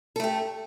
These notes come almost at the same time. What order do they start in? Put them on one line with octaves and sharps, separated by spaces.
A4 A3 G4